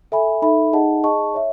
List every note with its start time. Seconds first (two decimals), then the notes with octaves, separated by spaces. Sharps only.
0.12 A4 E5 G#5 B5
0.42 D#4 A4 E5 B5
0.73 D#4 G#4 D#5 F#5 A5
1.04 G#4 D#5 A5 C#6
1.34 C#5 E5